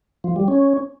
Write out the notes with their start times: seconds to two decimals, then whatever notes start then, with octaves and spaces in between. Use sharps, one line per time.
0.24 F3
0.36 G3
0.48 C#4